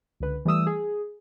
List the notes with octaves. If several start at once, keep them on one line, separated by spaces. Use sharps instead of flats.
C#2 D3 B4
E3 G3 A3 D#6 E6
G#4